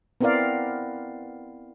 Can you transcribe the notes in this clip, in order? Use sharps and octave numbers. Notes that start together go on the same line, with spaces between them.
B3 C4 E4 A#4 D5 F5